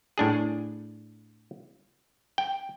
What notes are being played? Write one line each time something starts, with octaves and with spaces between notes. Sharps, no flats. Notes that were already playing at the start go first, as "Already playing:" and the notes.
A2 D4 G#4
G5